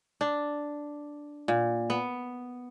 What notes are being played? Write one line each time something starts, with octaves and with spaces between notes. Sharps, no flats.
D4
A#2
B3